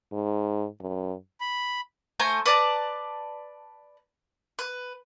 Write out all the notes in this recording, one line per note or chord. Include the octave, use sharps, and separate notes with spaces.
G#2
F#2
B5
A3 C5 G#5 A#5
B4 D5 A5 A#5
B4